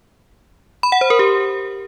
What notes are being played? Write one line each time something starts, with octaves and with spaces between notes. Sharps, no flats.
B5
F#5
C5
A#4
G4